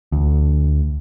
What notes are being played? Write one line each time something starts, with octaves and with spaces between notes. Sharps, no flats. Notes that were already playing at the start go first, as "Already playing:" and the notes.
D2